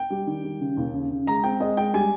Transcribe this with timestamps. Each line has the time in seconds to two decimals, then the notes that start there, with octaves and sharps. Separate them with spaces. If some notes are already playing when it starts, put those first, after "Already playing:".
Already playing: G5
0.10 G3
0.27 D#3
0.44 G3
0.60 C#3
0.77 D#2
0.94 C#3
1.11 C#3
1.27 G#3 A#5
1.44 C4 G5
1.60 G#3 D#5
1.77 G#3 G5
1.94 G3 G#5